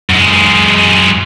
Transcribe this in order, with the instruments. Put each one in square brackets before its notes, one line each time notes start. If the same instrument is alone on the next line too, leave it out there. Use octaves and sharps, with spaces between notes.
[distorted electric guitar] F#2 G#3